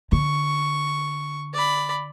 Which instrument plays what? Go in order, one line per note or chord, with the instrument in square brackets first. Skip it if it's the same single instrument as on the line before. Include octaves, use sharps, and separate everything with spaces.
[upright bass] D3 [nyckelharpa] C#6
[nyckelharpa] D5 B5